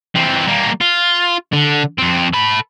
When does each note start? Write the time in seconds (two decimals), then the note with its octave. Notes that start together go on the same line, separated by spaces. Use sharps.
0.15 E3 C4
0.47 G3 A#3
0.81 F4
1.53 D3
1.98 F2 C4
2.33 A4 B5